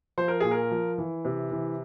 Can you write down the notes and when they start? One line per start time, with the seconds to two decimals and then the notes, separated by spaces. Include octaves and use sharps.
0.18 F3 C5
0.28 A#4
0.40 A#2 G#4
0.51 A#4
0.71 F3
0.98 E3
1.25 C3
1.51 E3